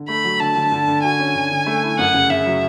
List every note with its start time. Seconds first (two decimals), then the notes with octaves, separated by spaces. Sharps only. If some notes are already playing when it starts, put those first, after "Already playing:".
Already playing: D3
0.08 A3 B5
0.24 F#3
0.40 D3 A5
0.56 D3
0.72 D3
0.88 D3
1.03 F#4 G#5
1.19 C#4
1.35 D3
1.51 D3
1.66 A3
1.83 E4
1.98 F#2 F#5
2.14 C#3
2.30 C#3 E5
2.46 F#3